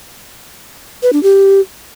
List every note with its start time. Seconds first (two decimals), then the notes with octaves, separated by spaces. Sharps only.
1.03 B4
1.13 D4
1.23 G4